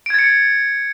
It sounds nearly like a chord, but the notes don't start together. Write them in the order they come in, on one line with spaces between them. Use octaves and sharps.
D7 G#6 A6 C#7